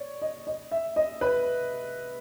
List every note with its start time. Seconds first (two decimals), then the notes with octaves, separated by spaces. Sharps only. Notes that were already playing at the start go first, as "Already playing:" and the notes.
Already playing: C#5 D5
0.22 D#5
0.47 D#5
0.72 E5
0.96 D#5
1.21 B4